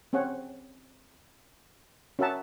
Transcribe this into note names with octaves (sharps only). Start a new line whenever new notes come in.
C4 C#4 G#4 C#5 F#5
C#4 F#4 A#4 E5 F#5 A5